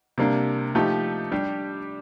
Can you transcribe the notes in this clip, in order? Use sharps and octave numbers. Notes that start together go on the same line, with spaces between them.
C3 G3 A#3 D4
F3 A3 D#4 G4
G3 D4 G4